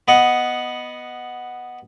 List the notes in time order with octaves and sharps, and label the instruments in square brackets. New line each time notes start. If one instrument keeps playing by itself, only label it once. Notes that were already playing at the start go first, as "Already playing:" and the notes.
[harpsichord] B3 D#5 F#5